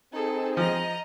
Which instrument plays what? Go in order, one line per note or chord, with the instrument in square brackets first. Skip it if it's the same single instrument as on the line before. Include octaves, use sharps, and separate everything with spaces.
[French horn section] C4 [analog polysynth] D#4 G#4 [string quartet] A4
[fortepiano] F3 [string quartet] D#5 A#5